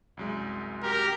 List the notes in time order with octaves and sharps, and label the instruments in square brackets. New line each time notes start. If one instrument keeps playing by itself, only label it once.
[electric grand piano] C2 F#2 G#3
[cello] G4 [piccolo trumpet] A#4